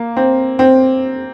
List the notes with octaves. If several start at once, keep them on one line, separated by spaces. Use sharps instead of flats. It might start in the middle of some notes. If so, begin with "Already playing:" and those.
Already playing: A#3
C4
C4